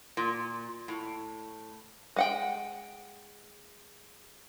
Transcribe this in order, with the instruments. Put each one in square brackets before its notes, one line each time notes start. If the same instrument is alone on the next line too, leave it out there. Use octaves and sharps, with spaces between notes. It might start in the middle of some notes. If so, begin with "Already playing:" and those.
[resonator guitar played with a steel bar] A#2
A2
[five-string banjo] G#3 F#5 G5